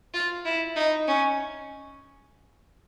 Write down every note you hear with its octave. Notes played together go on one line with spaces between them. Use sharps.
F4
E4
D#4
C#4